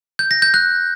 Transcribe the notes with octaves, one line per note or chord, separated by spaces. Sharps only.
G6
A#6
G6
F#6